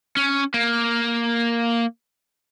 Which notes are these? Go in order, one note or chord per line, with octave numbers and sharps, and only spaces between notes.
C#4
A#3